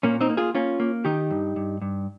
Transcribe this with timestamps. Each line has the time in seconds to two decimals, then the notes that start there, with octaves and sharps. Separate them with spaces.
0.03 A#2 A#3 C#4
0.21 C4 D#4
0.30 A#3
0.37 F4 G#4
0.55 A#3 C#4 F4
0.80 A#3
1.05 D#3 D#4 G4
1.31 G2
1.56 G2
1.82 G2